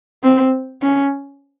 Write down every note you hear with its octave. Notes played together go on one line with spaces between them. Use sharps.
C4
C#4